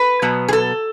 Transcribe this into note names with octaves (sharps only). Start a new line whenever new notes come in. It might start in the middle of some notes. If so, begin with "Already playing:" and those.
Already playing: B4
B2 F#3 B3
G#4
A4